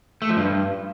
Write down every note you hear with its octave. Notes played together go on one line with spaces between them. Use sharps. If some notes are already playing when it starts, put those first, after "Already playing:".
A3
F3
G2